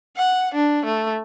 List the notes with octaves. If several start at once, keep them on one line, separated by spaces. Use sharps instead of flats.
F#5
D4
A3